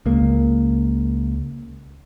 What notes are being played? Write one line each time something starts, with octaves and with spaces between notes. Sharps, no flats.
C#2 A#3